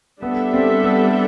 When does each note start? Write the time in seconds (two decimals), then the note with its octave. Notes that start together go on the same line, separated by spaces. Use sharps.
0.22 G3 B3 D4 A4 E5
0.54 C4
0.84 B3